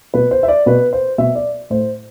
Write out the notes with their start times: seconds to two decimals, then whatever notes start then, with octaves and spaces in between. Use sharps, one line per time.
0.14 B2 B4
0.31 C5
0.43 E5
0.48 D5
0.66 B2 B4
0.93 C5
1.18 B2 E5
1.35 D5
1.70 A2 C5